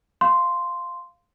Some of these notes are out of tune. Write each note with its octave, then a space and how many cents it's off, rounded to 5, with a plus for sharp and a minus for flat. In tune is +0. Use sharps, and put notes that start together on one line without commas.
F5 +0 C6 -5